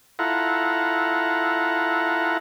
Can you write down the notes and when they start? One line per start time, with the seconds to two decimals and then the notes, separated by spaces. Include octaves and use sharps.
0.19 E4 F4 A4 F#5 A#5